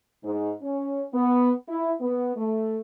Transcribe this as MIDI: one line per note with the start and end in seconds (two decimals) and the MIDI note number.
0.24 0.52 44
0.63 1.02 61
1.14 1.52 59
1.69 1.92 64
2.01 2.33 59
2.37 2.79 57